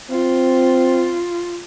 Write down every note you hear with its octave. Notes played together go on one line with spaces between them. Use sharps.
C4 F4